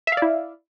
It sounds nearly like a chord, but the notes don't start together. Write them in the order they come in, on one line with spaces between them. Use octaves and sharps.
E5 F5 D5 E4